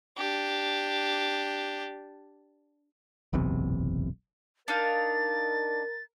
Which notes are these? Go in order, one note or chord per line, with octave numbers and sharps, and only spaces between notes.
D4 G4
F#1 B1 E2 C3
D4 D#4 A#4 F5 A6